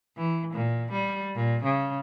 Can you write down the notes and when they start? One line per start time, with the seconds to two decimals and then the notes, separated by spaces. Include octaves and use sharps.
0.17 E3
0.53 A#2
0.92 G3
1.35 A#2
1.64 C#3